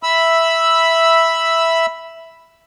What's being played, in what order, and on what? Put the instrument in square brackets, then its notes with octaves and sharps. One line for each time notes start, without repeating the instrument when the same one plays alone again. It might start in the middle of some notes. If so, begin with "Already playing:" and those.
[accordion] E5 B5 E6